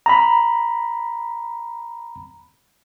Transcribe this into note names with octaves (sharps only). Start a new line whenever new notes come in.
A#5 B5